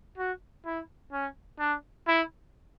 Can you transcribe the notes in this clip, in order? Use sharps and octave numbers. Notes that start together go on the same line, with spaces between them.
F#4
E4
C#4
D4
E4